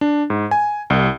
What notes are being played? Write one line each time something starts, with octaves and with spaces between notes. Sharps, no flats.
D4
G#2
G#5
C2